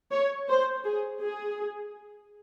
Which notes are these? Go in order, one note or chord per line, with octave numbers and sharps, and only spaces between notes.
C#5
C5
G#4
G#4